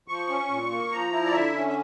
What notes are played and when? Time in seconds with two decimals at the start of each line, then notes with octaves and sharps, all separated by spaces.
0.08 F3 C#6
0.29 C#4
0.50 A#2
0.71 A#3
0.92 F3 A#5
1.12 E4
1.26 D5
1.33 D3 E5
1.54 C#4
1.68 E5